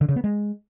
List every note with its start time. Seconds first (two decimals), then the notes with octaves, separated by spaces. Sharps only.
0.01 D3
0.09 C#3
0.16 B3
0.24 G#3